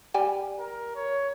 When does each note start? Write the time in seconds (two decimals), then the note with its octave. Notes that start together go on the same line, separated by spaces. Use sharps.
0.14 G3 G4 G#5
0.59 A#4
0.96 C#5